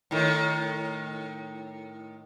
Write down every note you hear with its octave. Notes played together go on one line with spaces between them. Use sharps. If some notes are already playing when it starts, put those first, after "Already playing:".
A2 D#3